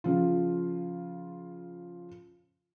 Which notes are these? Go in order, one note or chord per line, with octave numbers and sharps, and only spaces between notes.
C#3 F3 F4